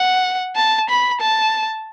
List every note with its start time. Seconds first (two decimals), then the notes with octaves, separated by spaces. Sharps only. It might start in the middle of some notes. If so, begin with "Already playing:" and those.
Already playing: F#5
0.56 A5
0.89 B5
1.21 A5